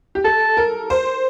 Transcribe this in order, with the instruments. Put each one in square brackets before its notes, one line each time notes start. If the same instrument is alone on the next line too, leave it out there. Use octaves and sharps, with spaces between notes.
[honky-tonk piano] G4
[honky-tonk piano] A4 [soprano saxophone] A5
[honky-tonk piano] A#4
C5